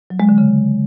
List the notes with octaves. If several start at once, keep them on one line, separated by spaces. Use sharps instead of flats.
F#3
G#3
D3
C#3